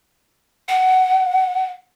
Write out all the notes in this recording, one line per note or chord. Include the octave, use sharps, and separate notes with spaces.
F#5